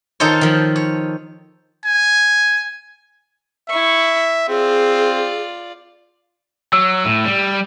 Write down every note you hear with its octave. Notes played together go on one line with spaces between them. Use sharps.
D#3 D#4 F4 A4 C5 C#5
D#3 F3
C#5
G#5
E4 E5 C#6
C4 F4 G#4 D5
F#3 E6
A2
G3